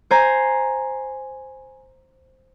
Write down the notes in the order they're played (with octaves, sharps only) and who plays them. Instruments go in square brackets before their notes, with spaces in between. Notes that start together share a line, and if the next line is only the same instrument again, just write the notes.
[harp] C5 G#5 A#5